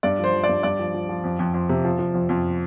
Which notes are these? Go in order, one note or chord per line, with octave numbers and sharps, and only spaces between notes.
G2 D5
F3 C5
F3
D5
G2
G2 D5
F3
F3
F3
F2
F2
F2
C3
F3
F3
F2
F2